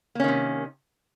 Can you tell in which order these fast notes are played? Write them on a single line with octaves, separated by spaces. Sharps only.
A#3 C#4 D#3 C3